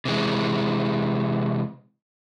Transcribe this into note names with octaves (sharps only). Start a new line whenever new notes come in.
C3 E3 G#3